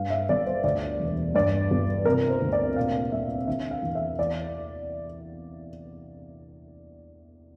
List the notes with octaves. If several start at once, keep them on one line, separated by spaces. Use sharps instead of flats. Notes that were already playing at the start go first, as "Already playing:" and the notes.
Already playing: G2 F5
E5
G1 D5
C5
D2 D5
E1
G2 D5
G1
C3 A#4
C5
D2
D5
A#2 F5
C2 E5
D3 E5
F5
E2
E5
E2 D5